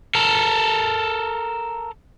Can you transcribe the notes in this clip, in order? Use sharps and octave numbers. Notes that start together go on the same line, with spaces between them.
A4 A#4